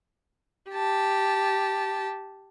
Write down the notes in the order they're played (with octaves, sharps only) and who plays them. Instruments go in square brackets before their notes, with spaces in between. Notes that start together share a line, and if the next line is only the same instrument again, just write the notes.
[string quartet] G4 A5